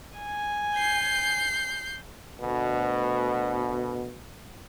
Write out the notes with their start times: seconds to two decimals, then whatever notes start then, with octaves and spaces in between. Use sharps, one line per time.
0.18 G#5
0.75 G6 C7
2.41 D2 B2